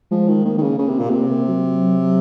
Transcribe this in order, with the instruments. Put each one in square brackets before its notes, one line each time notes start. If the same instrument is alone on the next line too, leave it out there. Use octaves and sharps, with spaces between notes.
[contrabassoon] F3 [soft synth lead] G#3
[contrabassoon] D#3
[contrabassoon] D#3 [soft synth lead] A#3
[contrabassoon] D#3
C#3
[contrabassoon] C#3 [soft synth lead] A#3
[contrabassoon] C3
A#2
[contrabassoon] C3 [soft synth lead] A#3
[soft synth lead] C4
A#3
F#3